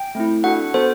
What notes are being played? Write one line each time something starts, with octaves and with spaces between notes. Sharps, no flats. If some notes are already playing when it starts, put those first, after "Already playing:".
Already playing: G5
A3 C4 E4
D4 F#4 A4 F#5
B3 F#4 A4 C5